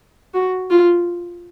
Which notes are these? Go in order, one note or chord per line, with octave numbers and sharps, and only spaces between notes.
F#4
F4